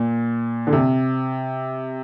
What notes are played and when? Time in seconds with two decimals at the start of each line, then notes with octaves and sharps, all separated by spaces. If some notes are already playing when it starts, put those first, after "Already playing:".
Already playing: A#2
0.67 D3
0.73 C3